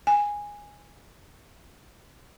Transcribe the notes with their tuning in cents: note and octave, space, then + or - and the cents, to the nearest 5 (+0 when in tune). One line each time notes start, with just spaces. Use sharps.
G#5 -10